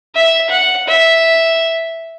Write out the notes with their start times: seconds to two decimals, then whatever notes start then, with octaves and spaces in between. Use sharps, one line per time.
0.15 E5
0.50 F#5
0.87 E5